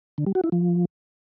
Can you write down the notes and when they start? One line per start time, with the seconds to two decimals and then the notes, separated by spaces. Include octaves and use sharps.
0.18 D3
0.27 G3
0.35 F#4
0.44 E4
0.52 F3